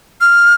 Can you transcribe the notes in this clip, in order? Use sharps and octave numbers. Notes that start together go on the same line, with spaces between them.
F6